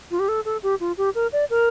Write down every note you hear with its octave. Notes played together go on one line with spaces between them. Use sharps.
F4
G4
A4
A4
G4
F4
G4
A#4
D5
A#4